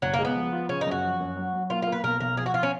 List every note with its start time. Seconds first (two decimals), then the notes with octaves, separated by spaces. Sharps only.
0.02 F#1 F#3
0.14 A#3
0.19 G#3
0.25 B3
0.36 F3
0.53 F4
0.69 C#3 C#4
0.81 D#4
0.86 F#2
0.91 F#4
1.04 F3
1.20 F#2
1.37 F#3
1.53 F#3
1.70 A#3 F4
1.82 F4
1.87 A#3 B4
2.04 B1 A#4
2.20 B1 A#4
2.37 F3 G#4
2.46 F#4
2.54 F4
2.63 C#4